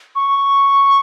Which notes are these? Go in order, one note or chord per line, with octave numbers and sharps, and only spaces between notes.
C#6